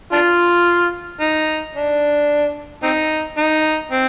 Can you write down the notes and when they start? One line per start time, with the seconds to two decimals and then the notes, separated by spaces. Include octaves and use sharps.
0.12 D4 F4
1.20 D#4
1.75 D4
2.83 C4 D#4
3.37 D#4
3.91 C4